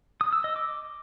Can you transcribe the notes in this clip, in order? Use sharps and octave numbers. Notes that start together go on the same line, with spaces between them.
D#6
E6
D#5
D6